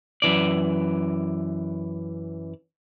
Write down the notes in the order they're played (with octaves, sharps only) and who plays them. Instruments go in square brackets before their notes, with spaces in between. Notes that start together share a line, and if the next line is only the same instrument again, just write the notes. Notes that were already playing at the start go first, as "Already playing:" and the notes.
[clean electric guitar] F#2 E3 D5